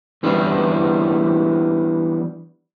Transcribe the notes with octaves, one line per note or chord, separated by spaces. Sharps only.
E3 G3 B3 D4 E4